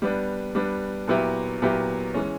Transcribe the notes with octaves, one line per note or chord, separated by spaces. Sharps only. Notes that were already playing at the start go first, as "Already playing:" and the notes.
G3 B3 D4
G3 B3 D4
A#2 F#3 B3 E4 G4
A#2 F#3 B3 E4 G4
E3 G#3 C#4